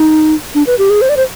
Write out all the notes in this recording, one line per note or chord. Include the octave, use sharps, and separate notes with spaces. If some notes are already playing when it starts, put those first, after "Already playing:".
Already playing: D#4
D4
B4
G4
G#4
C5
D5
C5